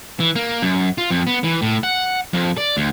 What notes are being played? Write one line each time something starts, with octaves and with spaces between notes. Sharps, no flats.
E3
A#3
F#2
F4
F2
B3
E3
A2
F#5
F2
D5
D2